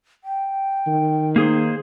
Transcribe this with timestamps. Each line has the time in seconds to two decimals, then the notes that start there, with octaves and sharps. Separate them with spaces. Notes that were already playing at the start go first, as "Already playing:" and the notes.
0.24 G5
0.87 D#3
1.36 A#3 D#4 G#4 C5